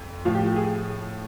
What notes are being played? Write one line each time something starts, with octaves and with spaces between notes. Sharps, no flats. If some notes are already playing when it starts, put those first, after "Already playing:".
Already playing: F2
A2 F3 F4
G4
G4
G#4